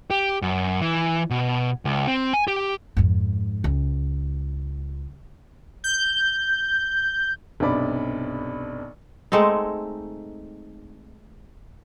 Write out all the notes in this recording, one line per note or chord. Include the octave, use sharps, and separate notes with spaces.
G4
F#2
E3
B2
C#2
C4
G#5
G4
F2 G#2
C#2
G6
B1 G2 C3 D5 B5
G#3 A3 C4 D#4